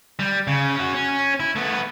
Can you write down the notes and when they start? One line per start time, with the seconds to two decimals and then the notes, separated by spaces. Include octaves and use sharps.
0.19 G3
0.47 C#3
0.76 C#4 F#4
0.94 C#4
1.40 E4
1.56 A3 B3